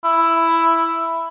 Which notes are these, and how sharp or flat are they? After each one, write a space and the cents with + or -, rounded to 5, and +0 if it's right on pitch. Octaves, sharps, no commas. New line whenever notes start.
E4 +5